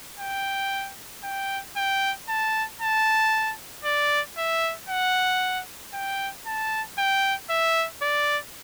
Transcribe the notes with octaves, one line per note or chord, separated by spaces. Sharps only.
G5
G5
G5
A5
A5
D5
E5
F#5
G5
A5
G5
E5
D5